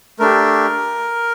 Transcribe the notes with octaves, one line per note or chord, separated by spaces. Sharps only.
A3 D4 G4 A#4